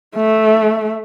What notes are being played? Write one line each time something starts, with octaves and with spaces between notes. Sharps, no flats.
A3